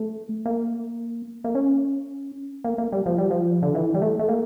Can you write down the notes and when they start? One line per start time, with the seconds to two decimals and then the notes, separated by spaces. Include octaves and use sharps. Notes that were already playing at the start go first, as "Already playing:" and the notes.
Already playing: A3
0.46 A#3
1.44 A#3
1.55 C#4
2.64 A#3
2.78 A#3
2.92 G3
3.06 F3
3.18 G3
3.31 F3
3.63 D3
3.75 E3
3.95 G3
4.02 A3
4.19 A3
4.29 A#3